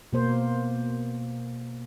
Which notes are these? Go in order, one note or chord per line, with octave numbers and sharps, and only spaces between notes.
B2 A#3 C5